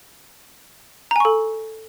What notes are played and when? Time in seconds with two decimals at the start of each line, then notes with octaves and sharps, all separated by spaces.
1.11 A#5
1.16 G#5
1.20 C#6
1.25 A4